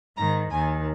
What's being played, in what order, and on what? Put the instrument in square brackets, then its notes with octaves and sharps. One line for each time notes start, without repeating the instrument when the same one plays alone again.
[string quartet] G#2 D#3 A#5
D#2 D#3 G#5